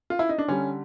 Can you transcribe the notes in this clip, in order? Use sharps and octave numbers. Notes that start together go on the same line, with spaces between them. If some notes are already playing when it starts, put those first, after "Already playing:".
F4
E4
D#4
D4
D3 G3 C#4